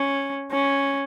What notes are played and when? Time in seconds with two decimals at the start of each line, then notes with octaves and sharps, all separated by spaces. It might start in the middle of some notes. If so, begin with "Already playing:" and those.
Already playing: C#4
0.52 C#4